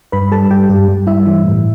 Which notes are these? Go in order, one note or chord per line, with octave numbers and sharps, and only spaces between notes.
G2 B4 B5
G3 A4 A5
G2 G4 G5
G2 G4
G2
G3 E4 E5
E3
A2